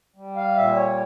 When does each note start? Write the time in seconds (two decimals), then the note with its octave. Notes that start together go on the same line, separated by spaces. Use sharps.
0.16 G3
0.36 F5
0.56 A#2 E5
0.76 C#5